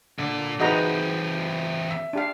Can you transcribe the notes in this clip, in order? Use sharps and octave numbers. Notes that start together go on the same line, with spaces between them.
A#2 D3 D5
E3 C4 D#4 F#4 G#4 B4 D#5 A#5
E5
D4 G4 F5